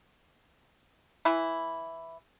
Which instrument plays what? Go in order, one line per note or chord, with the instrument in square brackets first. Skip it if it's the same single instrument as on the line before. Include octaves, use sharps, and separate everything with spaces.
[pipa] E3 E4